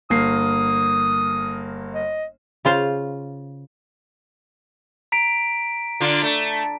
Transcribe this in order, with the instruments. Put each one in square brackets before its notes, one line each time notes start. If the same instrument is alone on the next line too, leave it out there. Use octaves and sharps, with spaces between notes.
[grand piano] G1 A#3 C7 [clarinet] D#6
[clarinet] D#5
[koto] C#3 F4 C5
[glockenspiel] A#5 B6 D7
[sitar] D3 F4
A3